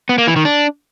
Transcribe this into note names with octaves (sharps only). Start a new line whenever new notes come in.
B3
A#3
E3
D#3
D4